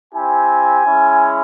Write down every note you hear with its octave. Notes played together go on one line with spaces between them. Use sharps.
C4 E4 G4 G#5
G#3 C#4 E4